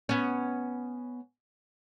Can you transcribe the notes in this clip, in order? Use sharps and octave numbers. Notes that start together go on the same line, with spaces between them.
B3 C#4